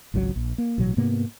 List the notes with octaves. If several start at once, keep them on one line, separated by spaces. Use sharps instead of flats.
G#1 C#2 D#3 F#3
A#1
A#3
A1 B2 F#3
G#2 C3 A#3 B3